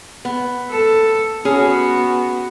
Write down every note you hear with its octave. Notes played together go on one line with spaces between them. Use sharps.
B3
A4
B3 C#4 F#4 G#4